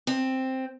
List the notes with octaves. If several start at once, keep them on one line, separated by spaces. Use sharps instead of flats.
C4